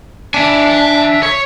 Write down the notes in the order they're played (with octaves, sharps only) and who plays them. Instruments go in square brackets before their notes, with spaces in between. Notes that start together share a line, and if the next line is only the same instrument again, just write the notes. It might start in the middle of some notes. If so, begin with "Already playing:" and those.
[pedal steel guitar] D4 [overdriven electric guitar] E5 G#5
[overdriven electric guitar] C#5